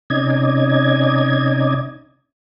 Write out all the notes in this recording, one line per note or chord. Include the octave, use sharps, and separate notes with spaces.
C3 C#4 D#4 D5 D#5 G#6